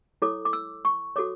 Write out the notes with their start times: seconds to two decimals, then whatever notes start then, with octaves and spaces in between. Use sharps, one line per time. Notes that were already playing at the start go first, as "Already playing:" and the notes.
0.22 E4 A4 C#5 D6
0.45 D6
0.53 E6
0.85 C#6
1.16 F#4 A4 C#5 D6